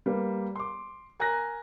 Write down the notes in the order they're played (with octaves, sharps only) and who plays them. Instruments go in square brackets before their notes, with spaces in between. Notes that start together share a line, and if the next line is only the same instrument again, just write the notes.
[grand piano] G3 A#3 B4
C6 D6
A#4 G#5 A#5 F#6 A#6